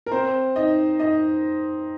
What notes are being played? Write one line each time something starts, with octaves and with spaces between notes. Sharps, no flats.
A#4
C4 C5
D#4 D#5
D#4 D#5